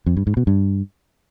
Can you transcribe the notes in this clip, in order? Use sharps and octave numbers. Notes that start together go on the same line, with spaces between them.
F2
G2
G#2
B2
G2